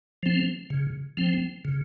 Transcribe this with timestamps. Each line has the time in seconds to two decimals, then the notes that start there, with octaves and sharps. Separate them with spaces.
0.23 F3 C4
0.70 C#3
1.17 F3 C4
1.65 C#3